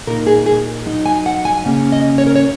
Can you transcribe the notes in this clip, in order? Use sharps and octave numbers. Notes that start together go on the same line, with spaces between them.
A#2 A#3 D#4 A#4
G#4
G#4
F#3 D#4
G#5
F#5
G#5
C#3 A#3 C#4
D#5
C#5
A#4
C#5